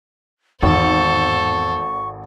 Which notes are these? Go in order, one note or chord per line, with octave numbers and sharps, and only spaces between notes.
G#1 E2 A2 A4 C5 C#6